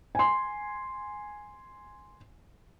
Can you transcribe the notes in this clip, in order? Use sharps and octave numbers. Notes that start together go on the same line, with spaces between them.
G#5 C6